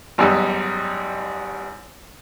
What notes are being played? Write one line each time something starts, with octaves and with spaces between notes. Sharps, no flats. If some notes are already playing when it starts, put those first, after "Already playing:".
G#1 F#2 G3 B3 D#4 E6